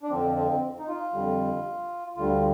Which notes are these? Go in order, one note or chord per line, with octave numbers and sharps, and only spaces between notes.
D4
F2 D3 F3 C4
C4
D#4
F4
F2 D3 G3
D2 D3 G3 F4